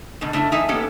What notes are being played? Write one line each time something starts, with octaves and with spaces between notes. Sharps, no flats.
G#2 B2 D3
C#3 A3 D4 E4
E3 D#4 E5 G#5
A#3 B3 C#4 G4 A4